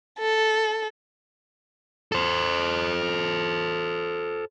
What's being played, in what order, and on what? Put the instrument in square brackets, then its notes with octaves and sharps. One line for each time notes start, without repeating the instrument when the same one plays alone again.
[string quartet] A4
[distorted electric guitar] A4 C5